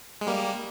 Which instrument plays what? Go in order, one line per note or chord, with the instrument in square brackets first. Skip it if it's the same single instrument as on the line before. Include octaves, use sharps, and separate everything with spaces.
[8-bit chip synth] G#3
G3 A#3